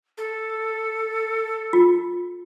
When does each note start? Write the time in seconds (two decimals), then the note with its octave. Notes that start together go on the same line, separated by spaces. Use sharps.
0.18 A4
1.73 F4